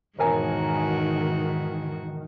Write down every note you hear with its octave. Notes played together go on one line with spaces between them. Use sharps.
E1 G#2 D#3 E3 F#4 A#4 G#5